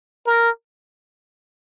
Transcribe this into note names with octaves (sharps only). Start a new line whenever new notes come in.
A#4